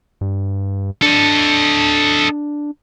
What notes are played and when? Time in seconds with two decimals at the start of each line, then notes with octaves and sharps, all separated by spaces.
0.21 G2
1.02 D4 A4 D#5